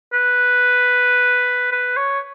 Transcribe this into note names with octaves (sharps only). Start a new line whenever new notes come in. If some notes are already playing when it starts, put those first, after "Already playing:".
B4
B4
C#5